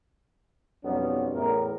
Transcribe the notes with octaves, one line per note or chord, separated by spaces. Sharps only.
B1 F2 G3 B3 C#4
E2 A2 A#4